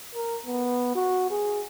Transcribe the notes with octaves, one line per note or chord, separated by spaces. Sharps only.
A#4
B3
F#4
G#4